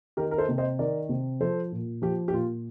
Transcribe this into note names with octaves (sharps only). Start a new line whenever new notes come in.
D#3 G4 A#4
A#4
A4 C5
C3
C5 D#5
D#3 A#4 D5
C3
F3 A4 C5
A#2
F3 G4
G4
A#2 F4